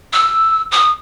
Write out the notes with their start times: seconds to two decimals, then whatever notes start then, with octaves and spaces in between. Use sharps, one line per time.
0.13 E6
0.72 D#6